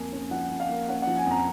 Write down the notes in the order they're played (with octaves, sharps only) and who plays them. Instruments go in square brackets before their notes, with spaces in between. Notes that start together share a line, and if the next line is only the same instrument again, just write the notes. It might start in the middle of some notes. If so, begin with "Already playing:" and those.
Already playing: [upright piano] F2 A#3 [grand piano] G#5
[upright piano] C#4
[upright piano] F3 [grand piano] F#5
[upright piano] F2
[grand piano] F5
[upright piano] A#3
[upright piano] C#4 [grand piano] F#5
[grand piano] F#5
[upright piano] F3
[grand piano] G#5
[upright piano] F2
[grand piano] A#5